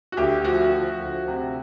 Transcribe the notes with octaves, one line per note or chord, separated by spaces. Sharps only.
F#4
D2 G4
F3 F#4
F3
D2
C3